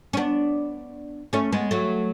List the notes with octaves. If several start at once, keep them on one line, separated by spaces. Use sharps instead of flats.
C#4
B3 D4
A3 C#4
G#3 B3
F#3 A3